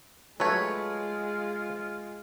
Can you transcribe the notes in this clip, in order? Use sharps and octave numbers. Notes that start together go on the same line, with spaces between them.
F#3 G#3 A3 F4 B4 C#5